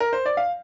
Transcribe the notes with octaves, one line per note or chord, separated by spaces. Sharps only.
A#4
C5
D5
F5